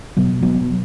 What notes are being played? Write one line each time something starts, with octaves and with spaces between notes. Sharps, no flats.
B2 F#3 B3
F#3 B3
B2